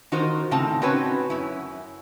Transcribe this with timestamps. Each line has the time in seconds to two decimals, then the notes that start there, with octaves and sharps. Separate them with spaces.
0.12 D#3 D#4 F4 F#4 A#4 C5
0.51 A2 C#3 C4 D#4 A5 A#5
0.82 C4 C#4 D#4 F#4 B4 C#5
1.30 F#2 E4